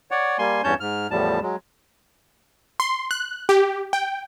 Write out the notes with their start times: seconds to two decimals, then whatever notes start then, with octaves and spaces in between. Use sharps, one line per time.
0.11 C#5 D5 F#5
0.39 G3 A#3 G#5 C6
0.64 E2 G2 C#4 C#5 A5 G6
0.80 G#2 F6
1.11 E2 A2 F3 G3 A5
1.42 F#3 G#3
2.80 C6
3.11 F#6
3.49 G4
3.93 G5